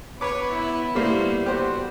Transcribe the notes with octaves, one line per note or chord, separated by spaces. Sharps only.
B3 B4 C#5 D6
E4
G3 A3 A#3 E4 C5
F#4 G4 C5